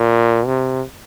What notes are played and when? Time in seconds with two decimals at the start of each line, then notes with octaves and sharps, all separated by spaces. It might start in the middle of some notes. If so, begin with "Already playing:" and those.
Already playing: A#2
0.46 C3